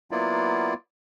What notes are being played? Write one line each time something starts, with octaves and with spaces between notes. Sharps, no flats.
F#3 A#3 B3 E4 F4 D5